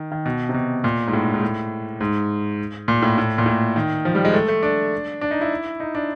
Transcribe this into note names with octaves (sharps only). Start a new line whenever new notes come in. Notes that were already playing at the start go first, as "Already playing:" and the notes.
Already playing: D#3
D#3
B2
C3
B2
A#2
G#2
A2
G#2
A2
G#2
A#2
A2
A2
A#2
A2
D#3
F3
G3
G#3
A3
A3
D4
D4
D#4
E4
D#4
D4